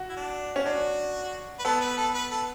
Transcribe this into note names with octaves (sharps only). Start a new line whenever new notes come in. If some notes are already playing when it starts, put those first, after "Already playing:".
Already playing: F#4
E4
D4
C#4
D4 F#4
B4
B3 A4
B4
A4
B4
A4